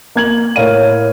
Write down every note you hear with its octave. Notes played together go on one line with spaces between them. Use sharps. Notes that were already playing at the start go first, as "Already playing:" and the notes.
A#3 G#6 F#7
A2 A#4 C#5 F5 D#7